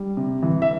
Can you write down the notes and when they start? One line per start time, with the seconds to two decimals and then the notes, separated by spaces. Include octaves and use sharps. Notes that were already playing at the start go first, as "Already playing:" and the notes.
Already playing: G3
0.17 C3
0.42 E3
0.62 E5